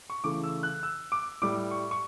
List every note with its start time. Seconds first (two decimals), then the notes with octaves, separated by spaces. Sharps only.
0.10 C#6
0.24 C#3 E3 A3 D6
0.44 E6
0.63 F#6
0.83 E6
1.12 D6
1.42 A2 G3 D6
1.71 C#6
1.91 C#6